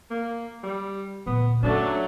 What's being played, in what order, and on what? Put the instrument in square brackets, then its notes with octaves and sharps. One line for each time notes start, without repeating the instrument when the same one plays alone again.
[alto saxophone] A#3
G3
[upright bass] D2 A#2 [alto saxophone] B3
[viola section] F#3 A3 [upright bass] C#4 [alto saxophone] D4